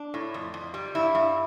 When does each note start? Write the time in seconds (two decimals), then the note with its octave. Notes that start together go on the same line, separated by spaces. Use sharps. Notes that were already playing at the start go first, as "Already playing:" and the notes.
Already playing: D4
0.14 A2
0.34 F2
0.54 F2
0.74 G3
0.95 G2 E4
1.15 G2